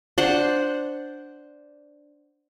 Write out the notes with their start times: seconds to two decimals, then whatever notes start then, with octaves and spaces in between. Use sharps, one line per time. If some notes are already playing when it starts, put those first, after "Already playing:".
0.18 D4 C5 F#5